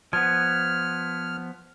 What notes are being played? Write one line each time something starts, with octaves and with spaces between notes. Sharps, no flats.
F3 B3 F6 G#6